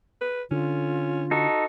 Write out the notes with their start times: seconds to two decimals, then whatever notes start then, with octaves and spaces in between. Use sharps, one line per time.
0.21 B4
0.51 D3 C#4 F4
1.31 D#4 F#4 A4